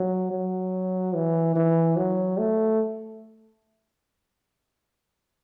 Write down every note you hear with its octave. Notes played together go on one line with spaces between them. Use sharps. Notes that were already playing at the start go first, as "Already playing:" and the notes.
Already playing: F#3
F#3
E3
E3
F#3
A3